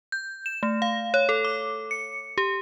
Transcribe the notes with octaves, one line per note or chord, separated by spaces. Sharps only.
G6
E7
A3
F5
C#5
A4
D6
C#7
G4